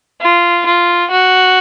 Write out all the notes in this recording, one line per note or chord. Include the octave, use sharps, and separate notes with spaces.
F4
F4
F#4